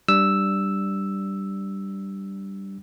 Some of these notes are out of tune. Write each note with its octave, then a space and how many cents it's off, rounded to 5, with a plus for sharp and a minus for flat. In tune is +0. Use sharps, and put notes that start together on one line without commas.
G3 -10 D4 +0 E6 +0